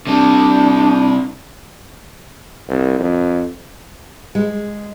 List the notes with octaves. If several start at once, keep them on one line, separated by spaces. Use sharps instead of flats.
C3 G3 D4
C2
F2
G#3